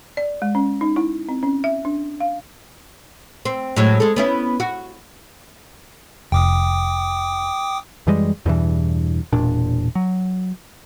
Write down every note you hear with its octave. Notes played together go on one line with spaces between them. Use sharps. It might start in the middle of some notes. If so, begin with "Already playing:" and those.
D5
G#3
C#4
D#4
E4
C4
C#4
E5
D4
F5
C4
A2 F#3 G#3
G#3 A4
B3 C#4 E4
F#4
F1 G5 D6 D#6
F#2 E3 G3 G#3
E2 G2 B2 E3
E1 A#2 D4
F#3